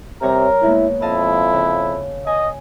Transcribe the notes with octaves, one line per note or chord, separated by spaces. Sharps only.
C3 G3 A#4 C#5 A#5
B2 G#3 A#3 E4
F2 E4 D#5 F5 A5
C#3
D#5 G#5